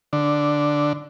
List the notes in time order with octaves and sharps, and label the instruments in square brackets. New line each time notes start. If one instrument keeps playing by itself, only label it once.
[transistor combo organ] D3